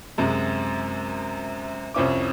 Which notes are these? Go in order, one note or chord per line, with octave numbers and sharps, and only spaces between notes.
F#2 C3 G#3
C2 F2 C4 C#4 E4 D6